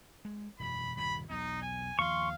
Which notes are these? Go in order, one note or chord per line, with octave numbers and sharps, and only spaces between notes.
G#3
E1 F#2 B5
D#1 G2 C3 B5
B1 E2 D#4
G#5
D#2 F3 F5 C6 C#6